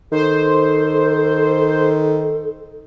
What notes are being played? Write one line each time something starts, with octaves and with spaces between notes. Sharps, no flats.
D#3 A4 C5